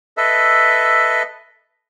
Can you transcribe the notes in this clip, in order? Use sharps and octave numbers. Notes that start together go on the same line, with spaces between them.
A4 B4 D#5 E5